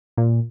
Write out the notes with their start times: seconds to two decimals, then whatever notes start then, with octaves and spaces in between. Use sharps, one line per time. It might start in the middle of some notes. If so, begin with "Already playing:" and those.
0.17 A#2